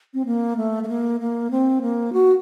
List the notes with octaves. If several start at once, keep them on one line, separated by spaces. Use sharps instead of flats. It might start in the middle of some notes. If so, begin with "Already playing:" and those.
C4
A#3
A3
A3
A#3
A#3
C4
A#3
F#4